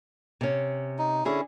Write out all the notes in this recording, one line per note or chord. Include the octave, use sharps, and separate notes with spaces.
C3 C#4
D#4
D3 C#4 E4 G#4